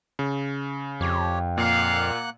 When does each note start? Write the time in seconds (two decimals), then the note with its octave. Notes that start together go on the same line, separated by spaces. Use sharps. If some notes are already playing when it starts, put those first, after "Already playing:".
0.19 C#3
1.01 F2 G4 C#5
1.58 A#2 A#3 F5 F#5 F#6